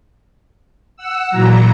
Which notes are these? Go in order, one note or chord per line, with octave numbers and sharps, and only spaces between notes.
F#5 E6
A#2 E3 F#3 A#5